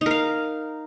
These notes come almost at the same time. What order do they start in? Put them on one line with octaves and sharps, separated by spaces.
D#4 A#4 F5